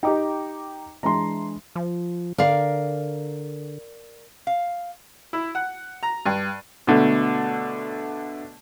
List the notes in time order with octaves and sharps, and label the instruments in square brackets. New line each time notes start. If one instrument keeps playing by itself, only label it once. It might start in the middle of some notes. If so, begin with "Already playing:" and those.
[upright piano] D#4 G4 [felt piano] G5 A#5 D6
[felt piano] E3 G#3 D4 [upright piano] A#5 C6
[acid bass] F3
[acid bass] D3 [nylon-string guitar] A#4 D5 F5
[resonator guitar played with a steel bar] F5
[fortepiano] E4
F#5
A#5
G2
B2 D3 A3